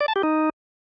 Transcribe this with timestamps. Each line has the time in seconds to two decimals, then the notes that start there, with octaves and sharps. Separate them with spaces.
0.01 D5
0.08 A5
0.16 G4
0.23 D#4